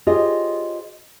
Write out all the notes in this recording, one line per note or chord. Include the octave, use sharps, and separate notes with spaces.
F4 G4 G#4 C5 C#5 D#5